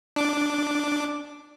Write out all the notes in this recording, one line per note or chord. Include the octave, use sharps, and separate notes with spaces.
D4 D6